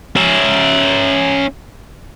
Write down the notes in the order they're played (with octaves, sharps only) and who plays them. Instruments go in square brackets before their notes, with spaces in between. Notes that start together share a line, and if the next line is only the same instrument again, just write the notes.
[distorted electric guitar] C#4 E5